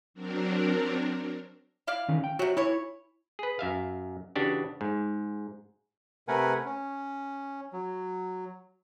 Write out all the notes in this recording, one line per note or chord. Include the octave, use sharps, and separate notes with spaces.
F#3 C4 D4 A#4
E4 D5 F5
D#3 E3 C#4
G5
C3 F#3 F#4
E3 E4 C#5
G#4 B4
F#2 E5 F5
C#3 E3 D4 F#4 G4
G#2
C3 A3 A#4 B4 F#5 G#5
C#4
F#3